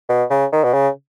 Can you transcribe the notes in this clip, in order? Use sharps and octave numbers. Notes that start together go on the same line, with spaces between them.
B2
C#3
D#3
B2
C#3